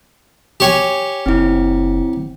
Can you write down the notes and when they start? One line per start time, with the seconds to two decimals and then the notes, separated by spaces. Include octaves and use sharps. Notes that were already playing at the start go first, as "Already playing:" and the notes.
0.60 G4 C#5 G#5
1.26 F#1 C4 E4